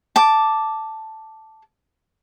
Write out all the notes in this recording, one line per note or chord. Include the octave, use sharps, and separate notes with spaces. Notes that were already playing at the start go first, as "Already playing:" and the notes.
A5 D6